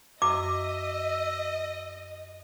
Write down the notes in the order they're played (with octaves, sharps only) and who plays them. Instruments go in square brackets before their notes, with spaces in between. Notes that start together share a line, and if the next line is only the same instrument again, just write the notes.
[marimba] F#2 [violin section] D#5 [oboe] E5 [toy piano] D6